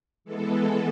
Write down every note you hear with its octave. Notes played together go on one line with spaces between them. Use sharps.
E3 G#3 B3 A4